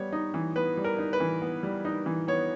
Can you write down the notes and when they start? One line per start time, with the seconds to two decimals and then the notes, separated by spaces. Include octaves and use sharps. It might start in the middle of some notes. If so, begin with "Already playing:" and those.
Already playing: G3 B3 C#5
0.13 D#4
0.34 E3
0.56 B3 B4
0.77 G3
0.84 A#4
0.99 D#4
1.13 B4
1.20 E3
1.42 B3
1.63 G3
1.85 D#4
2.06 E3
2.28 B3 C#5